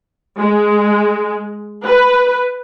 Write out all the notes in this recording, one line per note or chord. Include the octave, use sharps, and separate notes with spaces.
G#3
B4